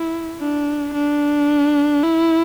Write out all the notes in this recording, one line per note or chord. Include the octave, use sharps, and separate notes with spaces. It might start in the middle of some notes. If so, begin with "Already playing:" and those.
Already playing: E4
D4
D4
E4